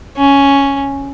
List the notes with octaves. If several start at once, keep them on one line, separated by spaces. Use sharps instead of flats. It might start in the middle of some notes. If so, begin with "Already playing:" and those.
C#4